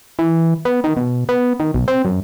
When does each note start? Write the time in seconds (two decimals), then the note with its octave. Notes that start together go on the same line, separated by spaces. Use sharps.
0.19 E3
0.65 B3
0.84 D#3
0.97 B2
1.29 B3
1.60 D#3
1.74 B1
1.88 C4
2.05 F#2